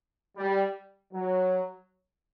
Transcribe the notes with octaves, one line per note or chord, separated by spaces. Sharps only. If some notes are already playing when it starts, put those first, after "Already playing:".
G3
F#3